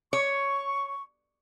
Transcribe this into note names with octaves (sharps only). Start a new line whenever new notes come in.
C#5 C#6